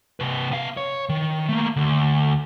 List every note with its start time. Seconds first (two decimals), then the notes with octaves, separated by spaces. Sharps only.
0.20 C3 B4
0.51 B3 F5
0.77 C#5
1.09 D#3
1.49 A3 A#3
1.76 D2